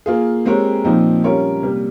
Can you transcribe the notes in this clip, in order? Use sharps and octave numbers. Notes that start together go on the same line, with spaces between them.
A#3 F4 G#4
G#3 C4 G4 A#4 C#5
A#2 F3 C4 D#4
G3 C#4 F4 A#4 C#5
C3 G3 A#3